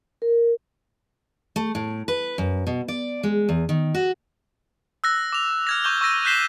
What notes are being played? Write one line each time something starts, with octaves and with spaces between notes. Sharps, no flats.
A#4
A3
A2
B4
F#2
B2
D5
G#3
E2
D#3
F#4
E6 F#6 A#6
D6 F7
F6 G#6 A#6
C#6 D6 G6 G7
C#6 E6 A#6 D#7
F#6 G6 B6 C7 E7 G7